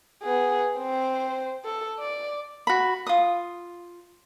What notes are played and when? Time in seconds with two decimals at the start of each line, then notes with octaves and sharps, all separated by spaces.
0.23 B3 G#4
0.78 C4 C5
1.65 A4
1.99 D5
2.67 F#4 B5
3.07 F4 D#6